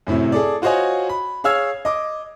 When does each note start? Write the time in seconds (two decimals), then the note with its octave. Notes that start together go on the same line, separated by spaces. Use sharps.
0.07 F#2 A2 C3 E4
0.32 G#4 A4 D5
0.62 F4 F#4 C5 C#5 D#5 G#5
1.09 B5
1.44 G#4 C#5 F5 E6 F6 G#6
1.85 D#5 D6